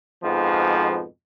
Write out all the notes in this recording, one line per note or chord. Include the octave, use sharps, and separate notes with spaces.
F2 G#2 B2 F3